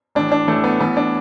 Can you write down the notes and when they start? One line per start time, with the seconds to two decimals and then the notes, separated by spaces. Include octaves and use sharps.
0.15 A1 A2 E3 D4
0.32 D4
0.48 A1 A2 E3 A3
0.64 B3
0.80 A1 A2 E3 B3
0.97 D4